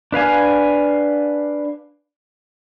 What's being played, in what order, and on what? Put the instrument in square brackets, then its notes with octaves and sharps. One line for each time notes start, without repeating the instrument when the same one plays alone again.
[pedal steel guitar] D4 B4 F5 G#5